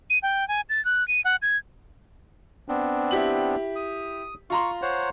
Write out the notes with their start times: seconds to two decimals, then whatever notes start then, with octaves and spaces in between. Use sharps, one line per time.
0.10 D#7
0.23 G5
0.48 G#5
0.69 A6
0.85 F#6
1.08 D#7
1.25 F#5
1.42 G#6
2.69 B3 C4 D4
3.11 E4 G4 F#7
3.76 D#6
4.50 F4 A#5 C6 C#6
4.82 C5 C#5 F#5